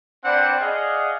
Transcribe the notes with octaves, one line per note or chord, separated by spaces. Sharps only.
C4 D4 B4 D5 F#5 G5
G#4 D5 D#5 F5 F#5